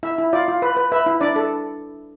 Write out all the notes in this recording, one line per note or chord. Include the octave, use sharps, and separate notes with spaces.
E4 E5
E4
F4 D5
F4
B4
B4
B4 E5
E4
D4 D5
A4